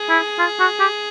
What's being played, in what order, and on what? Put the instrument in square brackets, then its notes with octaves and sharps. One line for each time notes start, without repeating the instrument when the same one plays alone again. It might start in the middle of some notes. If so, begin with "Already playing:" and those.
Already playing: [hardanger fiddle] G#4
[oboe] E4
F4
F#4
G4